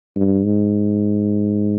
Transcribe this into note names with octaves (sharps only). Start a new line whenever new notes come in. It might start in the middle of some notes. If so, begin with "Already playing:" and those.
G2
G#2